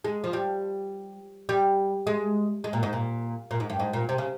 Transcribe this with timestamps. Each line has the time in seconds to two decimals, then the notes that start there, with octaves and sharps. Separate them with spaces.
0.04 G#3
0.24 F3
0.33 G3
1.49 G3
2.07 G#3
2.64 G#3
2.73 A#2
2.83 G#2
2.93 A#2
3.51 A#2
3.60 G#2
3.70 G2
3.79 G#2
3.93 A#2
4.09 C3
4.18 C#3